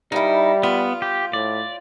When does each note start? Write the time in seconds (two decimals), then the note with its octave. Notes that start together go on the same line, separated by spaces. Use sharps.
0.12 G2 G3 D#4 E4
0.63 B3 F4
1.02 G4
1.33 A2 D5